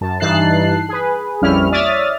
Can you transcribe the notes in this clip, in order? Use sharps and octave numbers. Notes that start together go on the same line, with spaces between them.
F#2 A5
G2 E3 D#4 A5 F#6 C7
G#4 B4
A#1 F2 G3 C#4 E4 F6
C#5 D5 E5 D#6 F6 A6